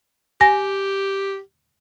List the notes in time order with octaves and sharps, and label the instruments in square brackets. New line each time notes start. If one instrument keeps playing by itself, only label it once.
[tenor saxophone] G4 [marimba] G#5 A#6